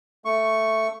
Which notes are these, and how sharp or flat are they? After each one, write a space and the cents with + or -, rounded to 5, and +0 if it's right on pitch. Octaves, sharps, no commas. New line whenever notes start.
A3 +5 C#6 +0